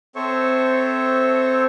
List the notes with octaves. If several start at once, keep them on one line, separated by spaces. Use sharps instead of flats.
C4 A4 C5 C#5 E5 C#6